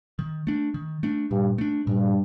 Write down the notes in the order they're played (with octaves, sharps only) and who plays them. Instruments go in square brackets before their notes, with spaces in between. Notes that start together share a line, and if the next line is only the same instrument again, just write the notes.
[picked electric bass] D#3
A3 D4
D#3
A3 D4
[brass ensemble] G2 [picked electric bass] A#2
[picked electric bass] A3 D4
[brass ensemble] G2 [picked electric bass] A#2